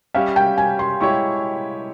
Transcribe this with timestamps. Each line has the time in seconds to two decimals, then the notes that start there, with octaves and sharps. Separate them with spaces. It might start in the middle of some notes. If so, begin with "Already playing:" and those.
0.14 G3 C#4 G4 C#5 E5 F5
0.36 G5
0.58 G#5
0.79 C6
1.00 G#3 E4 G4 C#5 C#6